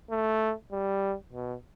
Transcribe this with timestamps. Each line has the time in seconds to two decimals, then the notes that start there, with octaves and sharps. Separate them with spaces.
0.10 A3
0.72 G3
1.33 B2